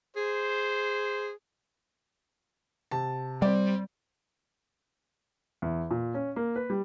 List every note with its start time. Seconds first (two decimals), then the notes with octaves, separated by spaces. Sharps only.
0.16 G#4 C5
2.91 C3 A5
3.42 G3 C4 D5
5.62 E2
5.91 A#2
6.14 C#4
6.36 A#3
6.56 B4
6.70 G3